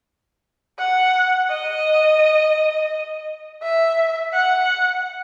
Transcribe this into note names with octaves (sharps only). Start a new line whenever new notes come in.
F#5
D#5
E5
F#5